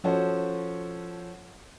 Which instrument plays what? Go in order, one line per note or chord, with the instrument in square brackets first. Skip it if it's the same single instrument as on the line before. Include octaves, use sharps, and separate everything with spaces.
[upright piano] F3 C#4 F#4 A4 C5